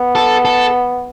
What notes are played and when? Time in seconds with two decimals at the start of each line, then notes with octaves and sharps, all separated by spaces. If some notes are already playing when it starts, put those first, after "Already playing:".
Already playing: B3
0.15 A4
0.45 A4